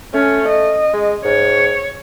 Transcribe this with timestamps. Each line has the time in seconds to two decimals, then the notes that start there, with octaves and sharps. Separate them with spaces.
0.14 A3 C#4
0.49 D#5
0.93 G#3
1.25 G#2 C#5